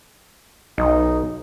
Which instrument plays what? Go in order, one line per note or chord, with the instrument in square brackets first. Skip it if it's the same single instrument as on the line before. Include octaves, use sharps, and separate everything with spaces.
[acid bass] B1 [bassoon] D#4